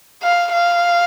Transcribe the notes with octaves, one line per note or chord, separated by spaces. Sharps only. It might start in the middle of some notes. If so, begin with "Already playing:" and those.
F5
F5